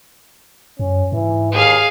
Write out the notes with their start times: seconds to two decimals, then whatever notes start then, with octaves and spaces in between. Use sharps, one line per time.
0.79 F#2 C#4
1.12 G#2 E3
1.52 D#2 G#4 F5